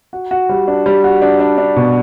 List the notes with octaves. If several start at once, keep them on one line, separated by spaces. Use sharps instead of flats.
F#4
F#4
G3
D4
G3
F#4
D4
D4
D4
B2